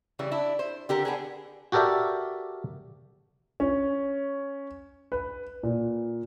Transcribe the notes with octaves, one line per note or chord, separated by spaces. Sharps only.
C#3 E3 G3
D4 E4
C5
D3 G4 A#4
B3 D4 G#4
F#4 G4 A4 A#4 D5 E5
C#4
B4
A#2